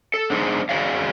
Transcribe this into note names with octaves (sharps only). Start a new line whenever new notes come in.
A4
B3 D4 D#4 G#4 C5 D5
C4 F#4 G#4 D5 D#5 F5